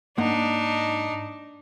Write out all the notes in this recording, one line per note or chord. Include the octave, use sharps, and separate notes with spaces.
G#2 A#3 D4 D#4 F#5